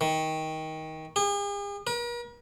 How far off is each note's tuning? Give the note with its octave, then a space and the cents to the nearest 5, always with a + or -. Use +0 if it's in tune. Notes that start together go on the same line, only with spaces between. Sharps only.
D#3 +20
G#4 -45
A#4 +45